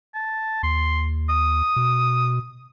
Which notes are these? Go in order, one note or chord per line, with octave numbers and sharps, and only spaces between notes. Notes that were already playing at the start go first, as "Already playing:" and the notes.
A5
D#2 C6
D#6
B2